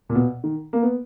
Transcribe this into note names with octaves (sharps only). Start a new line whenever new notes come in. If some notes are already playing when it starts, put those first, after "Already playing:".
A#2
B2
D#3
A#3
B3